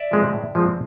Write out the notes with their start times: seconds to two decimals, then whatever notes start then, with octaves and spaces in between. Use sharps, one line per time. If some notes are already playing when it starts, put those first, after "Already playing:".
Already playing: D5 E5
0.11 F3 G#3 C4
0.33 A2
0.55 F3 G#3 C4